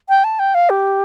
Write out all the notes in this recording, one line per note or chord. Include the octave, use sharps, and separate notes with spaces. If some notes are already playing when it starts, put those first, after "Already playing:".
G5
A5
G5
F5
G4